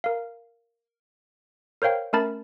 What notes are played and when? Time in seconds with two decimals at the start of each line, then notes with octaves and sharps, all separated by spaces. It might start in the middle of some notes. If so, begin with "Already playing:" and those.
0.04 A#4 F5
1.82 A#4 C5 C#5 F5 G5
2.13 A3 C#4 A#4 A5 B5 A6